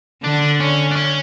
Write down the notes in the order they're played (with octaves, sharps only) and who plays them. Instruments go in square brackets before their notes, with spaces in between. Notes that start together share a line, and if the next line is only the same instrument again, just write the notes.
[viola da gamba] D3 [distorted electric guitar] D4
[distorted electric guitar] C#4
D4
C#4